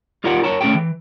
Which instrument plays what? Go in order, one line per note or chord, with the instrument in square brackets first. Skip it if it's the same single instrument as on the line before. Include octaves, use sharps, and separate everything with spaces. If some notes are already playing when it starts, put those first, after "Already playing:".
[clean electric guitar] D#4 F4 G4 A#4 D5 F#5
F#4 A#4 C#5 A5 A#5
A3 C#4 G#4 A4 G5
E3